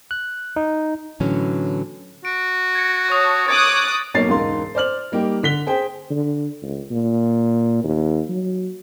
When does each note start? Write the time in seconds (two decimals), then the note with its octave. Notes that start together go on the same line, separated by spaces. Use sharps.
0.11 F#6
0.56 D#4
1.20 A2 D3 E3 F#3 C#4
2.25 F#4 D7
2.75 G#6 A#6 C#7
3.09 C#5 A5 C#6 D#6
3.48 C#5 D6 D#6 F#6 A6
4.14 B1 A#3 C#5 A6 C7
4.28 E1 C#2 G#2 A#4 F5 C6
4.75 C5 D5 F6 F#7
5.12 G3 A#3 D#4 G4
5.43 D3 B6 G7
5.67 G#4 C5 G5
6.11 D3
6.63 C#2
6.91 A#2
7.84 D#2
8.29 F#3